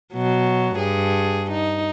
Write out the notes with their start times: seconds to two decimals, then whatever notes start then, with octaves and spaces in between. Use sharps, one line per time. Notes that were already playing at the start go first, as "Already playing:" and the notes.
0.14 B2 F#3
0.75 G2 G#4
1.51 D#4